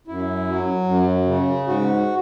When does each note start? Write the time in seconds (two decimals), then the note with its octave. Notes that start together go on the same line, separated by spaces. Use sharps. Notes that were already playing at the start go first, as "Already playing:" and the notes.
0.07 F#2 E4
0.48 F#3
0.87 F#2
1.27 C#3
1.67 G#2 F#4